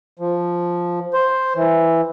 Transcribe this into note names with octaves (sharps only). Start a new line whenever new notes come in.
F3
C5
E3